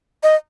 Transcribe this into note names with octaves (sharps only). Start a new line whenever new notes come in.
D#5